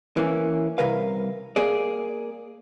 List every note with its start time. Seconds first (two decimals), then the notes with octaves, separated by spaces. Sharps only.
0.17 E3 A#3 C#4
0.78 C2 C3 A#4 B4 F5
1.56 A#3 G#4 D5